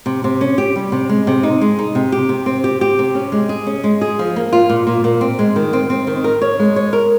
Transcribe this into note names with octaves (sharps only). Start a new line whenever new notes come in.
C3
C3
C#4
G4
G3
C3
G#3
C3
D#4
G#3
D#4
C3
G4
C3
C4
G4
G4
C3
C#4
G#3
G#4
C#4
G#3
G#4
F3
A#3
F4
A#2
A#2
A#2
C4
G#3
D#3
C4
C4
D#3
A#4
C#5
G#3
C#5
A#4